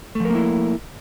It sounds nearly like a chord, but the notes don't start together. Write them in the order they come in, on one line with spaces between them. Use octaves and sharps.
A3 F3 A#4 A#3 E4